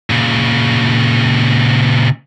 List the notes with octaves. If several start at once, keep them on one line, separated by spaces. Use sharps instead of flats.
A#2 C#3